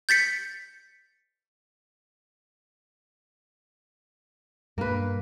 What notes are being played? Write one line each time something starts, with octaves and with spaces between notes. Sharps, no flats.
G6 A6 B6 C#7
G2 B2 A#3 B4